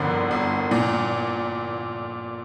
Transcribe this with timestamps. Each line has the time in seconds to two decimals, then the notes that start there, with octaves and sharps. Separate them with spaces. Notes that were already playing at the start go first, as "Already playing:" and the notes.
Already playing: G1 F2 D3 A#4
0.31 G1
0.71 A#2